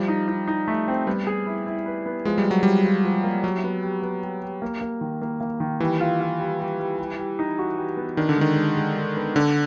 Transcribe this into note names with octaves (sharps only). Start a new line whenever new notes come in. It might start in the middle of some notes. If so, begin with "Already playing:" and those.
Already playing: F3 G3
D#4
D#4
D#4
A3
C4
G3 B3
G#4
E4
E4
B4
B3
F3 G#3
G3
F3
F#3
F3 G3
F3
F3
A#3
F#3 G3
B3
G3
B3
G3
G3
A#3
A#3
D#3
A#3
A#3
D#3
E3 G3
F4
F4
G3
G3
G3
G3
G3
D#4
F#4
G3
B3
D#3 D4
D3
D#3 G#3
G#3
G#3
G#3
B3
D3 D4